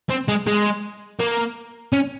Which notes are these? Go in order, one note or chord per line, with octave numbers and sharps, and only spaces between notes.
C4
G#3
G#3
A#3
C#4